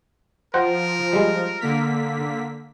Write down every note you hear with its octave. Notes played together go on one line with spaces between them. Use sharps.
F3 A#4 C5 F#5 G5
G3 G#3
D3 A#3 B6